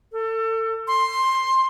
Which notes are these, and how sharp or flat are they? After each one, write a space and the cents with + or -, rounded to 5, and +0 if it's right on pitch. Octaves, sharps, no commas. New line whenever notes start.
A4 +30
C6 +10